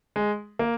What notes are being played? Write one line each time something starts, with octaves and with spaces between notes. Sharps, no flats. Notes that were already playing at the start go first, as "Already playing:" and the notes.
G#3
A#3